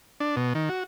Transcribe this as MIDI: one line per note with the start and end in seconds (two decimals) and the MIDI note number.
0.20 0.36 62
0.36 0.53 47
0.55 0.69 51
0.69 0.83 66